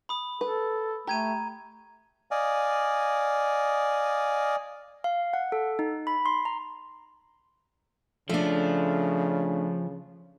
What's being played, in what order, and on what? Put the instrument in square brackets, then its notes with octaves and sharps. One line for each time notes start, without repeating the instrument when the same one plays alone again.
[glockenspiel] B5 D#6
[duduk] A4 [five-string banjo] B4
[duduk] A3 [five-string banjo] G4 [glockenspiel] A#5 G#6 D#7
[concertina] D5 D#5 F5 G#5
[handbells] F5
F#5
A4
D#4
B5
C6
A#5
[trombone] C#3 [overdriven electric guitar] F3 [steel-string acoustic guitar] A3 D4